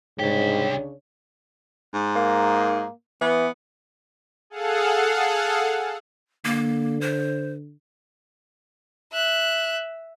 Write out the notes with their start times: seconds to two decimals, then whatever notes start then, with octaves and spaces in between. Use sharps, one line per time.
0.19 C2 G#2 C#3 D4 G4 C#5
1.93 G#2
2.15 A#3
3.21 E3 B3
4.50 G#4 A4 F5 F#5
6.45 D3 A#3
7.01 C5
9.12 E5 F#6